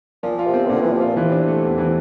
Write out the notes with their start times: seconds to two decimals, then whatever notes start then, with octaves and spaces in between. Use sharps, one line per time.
0.23 A#2 F3
0.39 F4
0.47 C3
0.54 C4
0.66 E3
0.69 A#2 D3
0.81 E3 F3
0.93 C3
1.01 A#2 F4
1.16 C3 E3
1.32 D4
1.48 A3
1.63 E2
1.78 E3